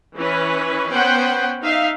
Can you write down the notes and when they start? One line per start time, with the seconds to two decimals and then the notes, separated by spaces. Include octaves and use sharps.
0.16 E3 C#4 B4
0.92 B3 C#4 C5 F#5 G5
1.62 D#4 E5 F5